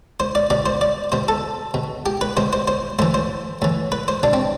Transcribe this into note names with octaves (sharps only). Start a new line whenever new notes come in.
C5
D5
B2 D5
C5
D5
B2 C5
A4
B2
G4
B4
B2 C5
C5
C5
A2 E3 C5
C5
A2 E3
B4
C5
B2 D4
C4